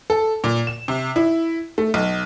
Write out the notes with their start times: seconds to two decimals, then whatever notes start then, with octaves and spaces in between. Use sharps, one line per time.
0.10 A4
0.44 A#2
0.67 E7
0.88 C3
1.16 E4
1.78 A3
1.94 B1